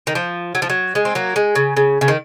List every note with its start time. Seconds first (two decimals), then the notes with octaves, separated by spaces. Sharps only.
0.07 D#3
0.15 F3
0.55 F#3
0.62 F3
0.70 F#3
0.95 G#3
1.05 C4
1.15 F#3 A#3
1.36 G#3
1.55 C#3
1.76 C#3
2.01 C#3
2.08 D#3